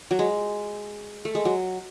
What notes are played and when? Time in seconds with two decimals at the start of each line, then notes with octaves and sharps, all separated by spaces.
0.11 F#3
0.19 G#3
1.25 A3
1.35 G#3
1.45 F#3